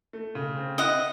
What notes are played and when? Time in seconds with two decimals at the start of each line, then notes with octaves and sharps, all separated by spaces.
0.13 A3
0.35 C#3
0.56 C4
0.78 E4 D#5 F#5